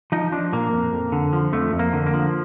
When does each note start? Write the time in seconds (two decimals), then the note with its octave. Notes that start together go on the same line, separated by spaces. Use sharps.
0.12 F3 D#4
0.32 F3 D4
0.53 A#2 A#3
0.73 F2
0.93 F2
1.12 D3
1.33 F3
1.53 F2 A3
1.73 F2
1.79 A#3
1.93 D3
2.06 A#3
2.14 F3